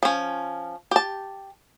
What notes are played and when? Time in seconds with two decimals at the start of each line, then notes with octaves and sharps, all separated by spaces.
0.03 F3 C#4
0.91 G4 A5